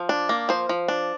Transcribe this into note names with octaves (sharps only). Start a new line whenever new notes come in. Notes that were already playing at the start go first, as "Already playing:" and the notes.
Already playing: F3
D4
A#3
F3 C5
F3
D4